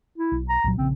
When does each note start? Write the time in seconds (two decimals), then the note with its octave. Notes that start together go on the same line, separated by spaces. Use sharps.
0.18 E4
0.32 B1
0.49 A#5
0.64 C2 A#2 F#3
0.78 A#1 C#3 C4